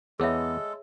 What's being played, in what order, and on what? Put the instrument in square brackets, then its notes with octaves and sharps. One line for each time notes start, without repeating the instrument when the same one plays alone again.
[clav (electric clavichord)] E2 B3 [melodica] G#3 A4 [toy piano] G#4 C#5 E5